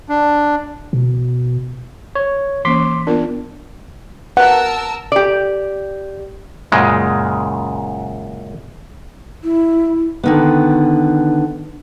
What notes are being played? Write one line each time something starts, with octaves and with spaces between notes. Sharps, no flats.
D4
B2
C#5
E3 A#3 C#4 C6 D6 B6
B3 D4 F4 A#4
B3 A#4 F#5 A5 E6
G4 D5
F#2 A#2 C#3 G#3
E4
D3 D#3 B3